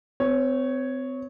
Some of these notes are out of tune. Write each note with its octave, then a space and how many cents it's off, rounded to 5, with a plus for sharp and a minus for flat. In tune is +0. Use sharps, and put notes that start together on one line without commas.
C4 -35 C#5 +0